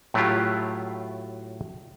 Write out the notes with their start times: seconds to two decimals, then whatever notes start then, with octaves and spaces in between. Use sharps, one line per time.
0.14 A2 F#3 A3 E4 F4 G4